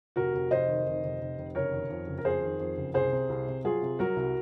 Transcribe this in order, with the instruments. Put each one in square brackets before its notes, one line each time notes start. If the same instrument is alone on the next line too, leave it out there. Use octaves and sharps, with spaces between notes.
[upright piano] F1 F#4 A#4
F1
F1 C5 D#5
D#3
F1
F1
F1
F1
F#1 A#4 C#5
D#3
F2
F#1
A#4
F2 G#4 C5
D#3
F2
F#1
C2 G#4 C5
C3
C2
C3
F#3 F4 G#4
C3
F#3 F#4 A#4
C2